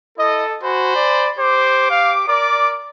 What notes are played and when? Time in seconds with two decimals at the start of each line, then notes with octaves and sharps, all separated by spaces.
0.18 E4 A4 D#5
0.63 F#4 C5 G#5 B5
0.96 D5
1.39 G4 C5 D6
1.90 F5
2.28 A#4 D5 D6